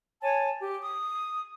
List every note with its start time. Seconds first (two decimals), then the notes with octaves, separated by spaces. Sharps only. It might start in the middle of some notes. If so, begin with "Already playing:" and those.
0.22 C#5 G#5 A5
0.58 G4
0.81 D#6